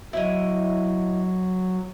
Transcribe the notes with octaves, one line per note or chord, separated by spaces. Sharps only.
F#3 E4 C#5 D#5